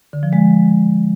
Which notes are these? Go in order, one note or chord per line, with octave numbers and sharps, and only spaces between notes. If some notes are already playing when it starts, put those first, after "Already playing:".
D3
F3
G#3